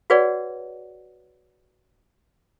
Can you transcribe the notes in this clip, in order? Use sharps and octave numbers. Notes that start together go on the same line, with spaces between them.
F#4 G#4 B4 C#5 D5 F#5